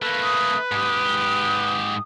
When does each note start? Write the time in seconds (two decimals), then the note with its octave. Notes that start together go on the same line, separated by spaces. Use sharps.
0.02 A3 A#3 B4
0.23 D#6
0.72 G#2 G4 D#6